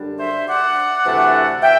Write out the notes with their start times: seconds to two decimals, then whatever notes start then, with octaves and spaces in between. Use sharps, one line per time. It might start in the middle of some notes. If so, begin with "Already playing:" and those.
Already playing: F#2 D3 G3 D4
0.19 C5 E5
0.48 D5 F#5
1.05 D2 C3 E3 A3 D4
1.62 E5 G5